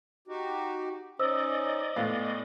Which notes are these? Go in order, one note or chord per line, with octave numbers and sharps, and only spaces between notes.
D#4 F#4 G4
C#4 D#4 C5 D5 D#5 D#6 E6
A2 G#3 B3 F5